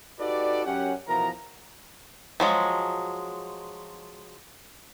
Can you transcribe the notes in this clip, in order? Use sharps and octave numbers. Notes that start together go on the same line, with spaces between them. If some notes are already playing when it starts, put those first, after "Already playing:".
D#4 F#4 G4 A4 B4 D5
F#2 C#4 G4 F#5
B2 E3 F3 B3 A#4 A#5
F3 F#3 G#3